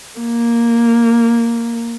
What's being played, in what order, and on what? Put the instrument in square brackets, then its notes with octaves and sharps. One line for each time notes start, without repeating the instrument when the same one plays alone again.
[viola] A#3